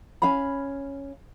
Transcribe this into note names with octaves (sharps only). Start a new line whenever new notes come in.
C#4 F5 B5